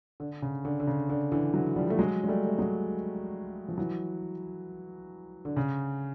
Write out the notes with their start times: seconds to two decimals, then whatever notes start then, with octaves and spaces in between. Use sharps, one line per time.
0.20 D3
0.42 C#3
0.65 D3
0.80 D3
0.87 C#3
1.09 D3
1.32 D3 E3
1.54 E3 F#3
1.76 F3 G3
1.90 A3
1.99 F#3 G#3
2.24 G#3
2.28 G3 A3
2.47 A3
2.58 F#3 G#3
3.68 F3
3.78 E3 F#3
5.45 D3
5.57 C#3